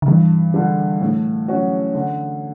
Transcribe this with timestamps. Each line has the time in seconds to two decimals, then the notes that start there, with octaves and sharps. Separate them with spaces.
0.02 D3
0.08 G2 E3
0.54 D3 G3
1.01 A2
1.48 F#3 C#4 F#4
1.95 D3